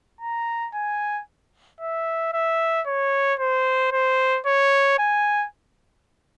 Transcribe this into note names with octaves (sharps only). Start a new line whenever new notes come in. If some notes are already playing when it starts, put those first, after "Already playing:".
A#5
G#5
E5
E5
C#5
C5
C5
C#5
G#5